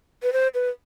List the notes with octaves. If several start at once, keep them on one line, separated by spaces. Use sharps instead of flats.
B4
C5
B4